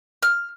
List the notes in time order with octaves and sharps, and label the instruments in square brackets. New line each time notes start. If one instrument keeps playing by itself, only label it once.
[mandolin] F6